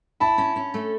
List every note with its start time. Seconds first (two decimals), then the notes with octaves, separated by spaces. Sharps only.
0.20 E4 A5 B5
0.38 C#4
0.56 C#4
0.74 A3